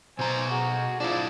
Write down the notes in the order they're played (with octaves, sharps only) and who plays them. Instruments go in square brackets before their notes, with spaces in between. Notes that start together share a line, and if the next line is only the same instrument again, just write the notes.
[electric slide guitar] B2 A#5 [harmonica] C5 G#5
[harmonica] F#4 G#4
[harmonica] F3 D5 [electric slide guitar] D4 E4